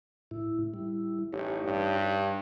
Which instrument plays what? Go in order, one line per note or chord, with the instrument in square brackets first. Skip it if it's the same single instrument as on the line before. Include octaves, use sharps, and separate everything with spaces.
[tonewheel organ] A2 E4
G3 E4
[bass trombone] A1 [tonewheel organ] D#4 G4 C#5
[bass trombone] G2